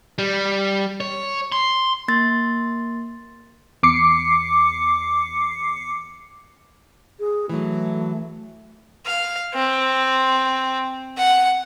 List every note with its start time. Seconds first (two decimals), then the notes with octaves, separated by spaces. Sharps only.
0.18 G3
1.01 C#5
1.52 C6
2.08 A#3 C6 A6
3.83 E2 D6 C7 C#7
7.20 G#4
7.49 E3 F#3 A3
9.06 F5
9.54 C4
11.18 F#5